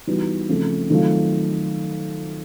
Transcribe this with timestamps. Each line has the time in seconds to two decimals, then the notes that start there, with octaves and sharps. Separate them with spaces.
0.07 E3 G3 B3 D#4 F#4
0.49 C#3 F3 A3 C4
0.90 D#3 F#3 A3 C4 F4